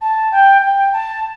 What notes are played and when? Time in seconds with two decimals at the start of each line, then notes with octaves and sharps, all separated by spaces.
0.01 A5
0.32 G5
0.62 G5
0.93 A5